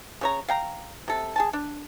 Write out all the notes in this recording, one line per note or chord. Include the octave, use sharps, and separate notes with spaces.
C#3 C#5 A#5
F5 G5 A#5
C3 A4
G#4 G#5 A5
D4